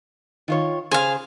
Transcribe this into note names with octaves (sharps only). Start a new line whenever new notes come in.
D#3 F4 C#5
C#3 G#4 C5 F5 G#5